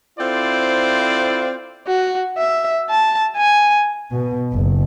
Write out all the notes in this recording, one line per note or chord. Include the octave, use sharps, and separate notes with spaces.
C4 E4 F4 A4 C5 D5
F#4
E5
A5
G#5
B2
F#1